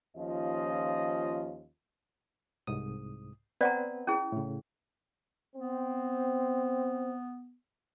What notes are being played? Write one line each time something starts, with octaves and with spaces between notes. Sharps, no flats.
D#2 F3 C#4 F4 D#5
C2 G#2 D#6
B3 C4 B4 D5 F#5 A#5
C#4 E4 G#4
A2 C#3
B3 C4